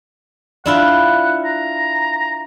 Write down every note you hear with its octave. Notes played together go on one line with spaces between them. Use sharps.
D4 E4 F4 F#5
A#5